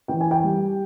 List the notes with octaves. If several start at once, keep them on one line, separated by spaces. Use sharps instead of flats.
E3 G5
G#5
G5
G3